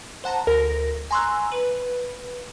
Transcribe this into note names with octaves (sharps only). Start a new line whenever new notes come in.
C5 F#5 A5 A#5
D2 A#4 A#6
G#5 A#5 C6 C#6 E6 F#6
B4